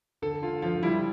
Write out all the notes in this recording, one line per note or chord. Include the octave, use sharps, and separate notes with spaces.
D3 A4
D3 F4
F3 F4
G3 E4